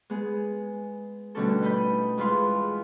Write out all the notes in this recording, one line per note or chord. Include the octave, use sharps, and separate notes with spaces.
G#3 B3 G#4
B2 D3 G3 A3 C#4 A4
D#4 B4 D#5 B5 G6
E2 G#3 F4 B4 F5 C6